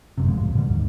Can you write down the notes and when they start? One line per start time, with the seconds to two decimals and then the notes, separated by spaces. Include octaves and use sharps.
0.18 G1 F#2 C3
0.29 D2 A2 F3 G#3
0.43 C#2 A2
0.55 B2 D3 G3
0.70 D#2 G#2 D#3